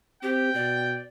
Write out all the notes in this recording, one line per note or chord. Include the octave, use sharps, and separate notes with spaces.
C4 G4 G5
B2 D5